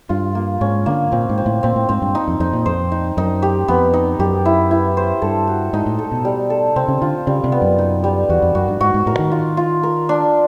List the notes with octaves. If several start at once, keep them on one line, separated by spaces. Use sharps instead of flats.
G2 F4
A#3
G#2 C#4
D3 A#3
A#2 C4
G#2
C4
A2
A#2 C4
A2
G#2 C4
G2
D#4
F2
F2 D#4
A#2
F2 C5
D#4
F#2 D#4
G4
F2 B3
D#4
F#2 G4
E4
E4
C5
G2 A4
F#4
G#2 D#4
A2
A4
B2
G3
A4
C3 C4
C#3
D3 F4
C#3 G3
C3
B3
F#2
D#4
G3
E2 F#4
F2
F#2 F#4
G2
G#2 F#4
G#2
A2 A#4
D#3
F4
F4
A#4
D4